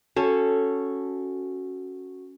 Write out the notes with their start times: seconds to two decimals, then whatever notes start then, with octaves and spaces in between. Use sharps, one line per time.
0.16 C#4 F#4 A4